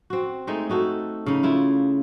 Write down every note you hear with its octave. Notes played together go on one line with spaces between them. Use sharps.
C4 F#4
G#3 A3 D#4
D#4 F#4 A4
C#3 D#4
A3 E4 F4